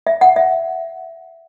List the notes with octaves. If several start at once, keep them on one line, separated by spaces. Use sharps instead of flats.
E5
F#5
E5